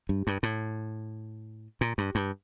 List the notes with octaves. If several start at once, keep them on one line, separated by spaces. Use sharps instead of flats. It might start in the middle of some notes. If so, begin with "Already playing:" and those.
G2
G2
A2
A#2
G2
G2